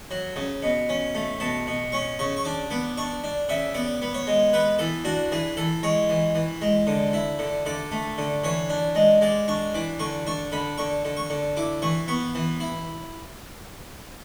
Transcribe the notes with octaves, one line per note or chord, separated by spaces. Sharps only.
F#3
C#3
B2
C#4
A3
B2 A5
B2
C#4 C#6
C#3 C#6
C#6
D4 D6
B3 D6
D4 C#6
D4
C#3 E5
B3 D5
B3
C#5
G#3
B3 B4
E3 A4
D4 F#4
E3 G#4
E3 A4
G#3 C#5
E3
E3
G#3
D3
E4
D3
D3 D5
A3
D3
E3 C#5
D4
G#3
G#3 D5
D4 C#6
E3 D6
D3 C#6
D4 C#6
D3 B5
D3 C#6
D3
C#6
D3
E4 D6
E3 C#6
B3 C#6
E3
E4